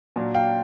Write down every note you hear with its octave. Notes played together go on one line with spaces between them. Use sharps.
A#2 F#3 A#3 D4
F5 G5